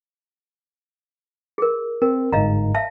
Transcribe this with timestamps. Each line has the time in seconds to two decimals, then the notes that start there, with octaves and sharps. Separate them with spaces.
1.58 G#4 A#4
2.02 C4 A#4
2.32 G1 G#2 D#5 F5 A#5
2.75 E5 F5 A5